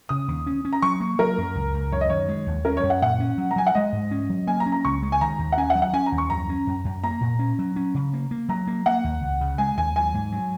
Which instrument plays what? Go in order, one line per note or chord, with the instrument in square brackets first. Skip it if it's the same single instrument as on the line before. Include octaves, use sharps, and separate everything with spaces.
[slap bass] C#3 [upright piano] D#6
[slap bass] D#2
C#4
C#4
[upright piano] A#5
[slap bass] F#3 [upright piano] C#6
[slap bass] A#3
[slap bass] F#3 [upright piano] A#4
[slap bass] F#2
C#2
C#2
[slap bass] F#2 [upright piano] C#5
[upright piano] D#5
[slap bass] D#3 [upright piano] C#5
[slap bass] G#3
D#2
[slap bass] C#4 [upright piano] A#4
[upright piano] C#5
[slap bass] F#2
[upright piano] F#5
[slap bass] A#2 [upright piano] F#5
[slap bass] C#4
F#3
[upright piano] A#5
[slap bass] F#3 [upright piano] G#5
[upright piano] F#5
[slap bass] G#3 [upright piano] D#5
[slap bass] G#2
C#4
F#3
[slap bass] A#3 [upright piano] G#5
[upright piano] A#5
[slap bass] C#4
[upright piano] A#5
[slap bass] C#2 [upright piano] C#6
[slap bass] G#3
[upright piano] G#5
[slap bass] D#3 [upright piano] A#5
[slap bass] D#2
[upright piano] F#5
[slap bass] C#4 [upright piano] G#5
[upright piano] F#5
[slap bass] F#3
[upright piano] F#5
[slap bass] C#4 [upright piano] G#5
[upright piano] A#5
[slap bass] D#2
[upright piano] C#6
[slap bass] F#2 [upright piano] A#5
[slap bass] C#4
F#2
F#2
[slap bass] A#3 [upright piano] A#5
[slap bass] A#2
C#4
F#3
C#4
C#3
A#3
A#3
[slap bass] F#3 [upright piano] A#5
[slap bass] A#3
[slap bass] A#3 [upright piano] F#5
[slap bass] D#2
C#2
C#3
[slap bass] G#3 [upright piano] G#5
[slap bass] D#2 [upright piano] G#5
[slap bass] F#3 [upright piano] G#5
[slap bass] G#2
F#3